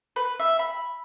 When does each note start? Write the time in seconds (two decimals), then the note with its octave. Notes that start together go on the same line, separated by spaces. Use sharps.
0.16 B4
0.40 E5
0.59 B5